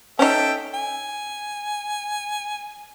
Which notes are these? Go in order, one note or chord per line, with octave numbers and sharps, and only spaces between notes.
C#4 D#4 A4 E5 G5
G#5